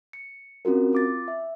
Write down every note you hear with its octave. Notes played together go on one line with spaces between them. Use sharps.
C#7
C4 C#4 F4 F#4 A#4
F4 D6 A6
E5